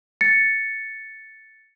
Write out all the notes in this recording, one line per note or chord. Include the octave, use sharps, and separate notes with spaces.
A6 C#7